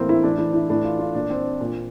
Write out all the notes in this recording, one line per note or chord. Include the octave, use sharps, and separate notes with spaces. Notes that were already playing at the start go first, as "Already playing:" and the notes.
Already playing: A2 E3 A#3 C4
E4
A2 E3 D4
E4
E4
A2 E3 D4
F4
F4
A#2 D4
C4
A#2